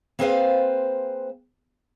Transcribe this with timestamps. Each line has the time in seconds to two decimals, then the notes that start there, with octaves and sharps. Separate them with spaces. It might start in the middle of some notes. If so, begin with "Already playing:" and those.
0.19 A#3 C4 G#4 B4 C5 F5